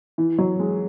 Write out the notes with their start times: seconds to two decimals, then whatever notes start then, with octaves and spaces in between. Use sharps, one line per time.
0.18 E3
0.38 F#3
0.60 G#3